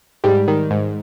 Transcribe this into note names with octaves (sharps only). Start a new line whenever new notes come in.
G#2 G3
D#3
G#2